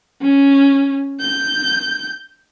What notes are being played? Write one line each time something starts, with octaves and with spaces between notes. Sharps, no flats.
C#4
G6